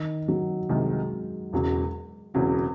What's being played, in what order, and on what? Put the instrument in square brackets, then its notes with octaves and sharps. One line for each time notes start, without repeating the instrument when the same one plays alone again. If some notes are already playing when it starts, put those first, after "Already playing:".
Already playing: [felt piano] D#3
F#3
[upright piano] C2 C3 D#3 [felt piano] G#3
[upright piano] E1 E2 C#3 F#3
[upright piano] E1 E2 C#3 F#3 [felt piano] C4